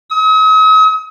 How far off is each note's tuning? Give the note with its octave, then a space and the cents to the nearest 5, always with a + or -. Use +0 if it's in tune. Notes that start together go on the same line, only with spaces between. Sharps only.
D#6 +45